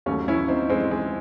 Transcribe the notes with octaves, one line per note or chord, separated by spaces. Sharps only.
D#2 D#3 F#3 A3 C#4
C#4 E4
C4 D#4
G#3 C4
G#3